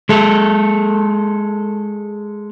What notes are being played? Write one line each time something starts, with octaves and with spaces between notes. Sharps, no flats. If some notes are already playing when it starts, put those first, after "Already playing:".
G#3 A4